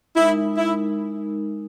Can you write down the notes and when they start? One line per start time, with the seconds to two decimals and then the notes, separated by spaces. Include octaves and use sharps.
0.16 G#3 D#4 E4 A#4
0.57 E4